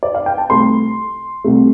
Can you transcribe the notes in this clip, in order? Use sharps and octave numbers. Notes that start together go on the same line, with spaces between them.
D5
F5
G5
A5
C2 C3 A3 C6
C2 C3 A3